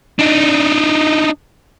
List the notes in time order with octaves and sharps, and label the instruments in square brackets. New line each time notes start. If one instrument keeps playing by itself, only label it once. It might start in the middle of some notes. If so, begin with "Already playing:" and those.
[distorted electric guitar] D4 D#4